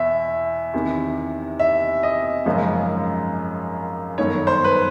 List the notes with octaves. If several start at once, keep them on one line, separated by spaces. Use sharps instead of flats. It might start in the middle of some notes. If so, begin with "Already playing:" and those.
Already playing: E2 B2 E5
E2 C3 D#3
E5
D#5
G#1 F#2 C#3 F3
G1 F#2 D#3 C#5
C5
B4